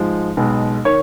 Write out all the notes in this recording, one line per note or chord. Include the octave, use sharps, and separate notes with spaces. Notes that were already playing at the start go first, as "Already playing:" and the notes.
Already playing: G#2 F3 G#3
B1 B2 G#3 B3
D#3 C#5